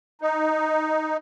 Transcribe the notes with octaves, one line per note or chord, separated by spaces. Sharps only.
D#4